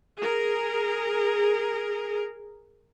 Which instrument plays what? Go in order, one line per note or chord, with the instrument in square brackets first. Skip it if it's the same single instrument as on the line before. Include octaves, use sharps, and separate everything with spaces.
[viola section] G#4 A#4